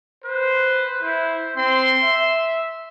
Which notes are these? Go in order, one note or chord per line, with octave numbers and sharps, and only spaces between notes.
B4 C5
E4 C5
C4 C6
E5